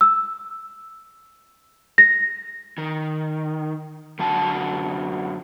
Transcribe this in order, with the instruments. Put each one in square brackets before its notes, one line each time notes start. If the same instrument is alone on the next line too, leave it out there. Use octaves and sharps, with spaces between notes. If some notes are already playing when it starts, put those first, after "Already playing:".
[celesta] E6
A#6
[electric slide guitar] D#3
F#2 D3 F#4 A5